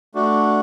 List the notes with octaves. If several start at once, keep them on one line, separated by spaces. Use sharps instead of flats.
A3 D4 F#4